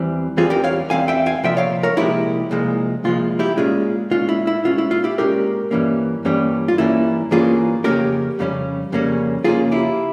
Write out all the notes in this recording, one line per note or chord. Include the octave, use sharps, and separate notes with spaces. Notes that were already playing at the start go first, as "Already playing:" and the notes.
Already playing: E2 E3 G3 C4
E2 E3 G3 C4 F4 G#4
G4 A#4
C#5 F5
E2 E3 G3 C4 F5 G#5
E5 G5
F5 G#5
C2 A#2 F3 E5 G5
C#5 F5
A#4 C#5
C2 A#2 F3 G#3 E4 G4
C2 A#2 F3 G#3
C2 A#2 F3 G#3 F4
E4 G4
A#2 G#3 C#4 F4 G#4
A#2 G#3 C#4 F4
E4
E4
A#2 G#3 C#4 F4
E4
F4
E4 G4
A#2 G#3 C#4 G4 A#4
G2 E3 G3 A#3 C#4
G2 E3 G3 A#3 C#4
F4
G2 E3 G3 A#3 C#4 E4
G2 E3 G3 A#3 C#4 F4 G#4
F2 C#3 G3 A#3 C#4 G4 A#4
F2 C#3 G3 A#3 C#4
F2 C#3 G3 A#3 C#4
F2 C#3 G3 A#3 C#4 F4 G#4
E4 G4